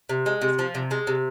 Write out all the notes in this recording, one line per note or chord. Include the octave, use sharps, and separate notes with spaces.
C3
G#3
C3
F3
C3
G#3
C3